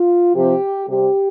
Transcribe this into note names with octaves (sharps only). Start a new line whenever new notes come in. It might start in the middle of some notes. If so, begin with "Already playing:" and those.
Already playing: F4
C3 F3 C4 G4
C3 G3 C4 G4